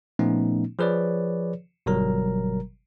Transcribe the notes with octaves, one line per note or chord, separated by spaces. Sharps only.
A#2 F3 A3 B3 C#4 D#4
F3 G#4 B4 C#5 D5
G1 B2 F#3 G3 A#4 A#5